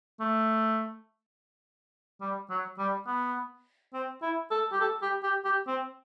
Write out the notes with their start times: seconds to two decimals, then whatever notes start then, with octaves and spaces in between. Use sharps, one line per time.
0.20 A3
2.21 G3
2.50 F#3
2.79 G3
3.07 B3
3.94 C4
4.22 E4
4.51 A4
4.72 G4
4.81 A4
5.02 G4
5.23 G4
5.45 G4
5.67 C4